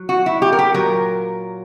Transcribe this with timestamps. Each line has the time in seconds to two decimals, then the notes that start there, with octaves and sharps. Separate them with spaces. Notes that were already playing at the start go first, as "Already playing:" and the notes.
Already playing: F#3
0.09 F#4
0.26 E4
0.42 G4
0.53 A#4
0.59 G4
0.74 A#2 F#3 A#4